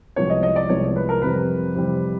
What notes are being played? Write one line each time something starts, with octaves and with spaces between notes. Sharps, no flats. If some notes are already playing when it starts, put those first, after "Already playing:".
C2 C3 F3 G#3 B3 C#5
D#5
D#5
D5
C2 C3 F3 G#3 B3 C#5
B4
A#4
F2 C3 E3 G3 C4 B4
F2 C3 E3 G3 C4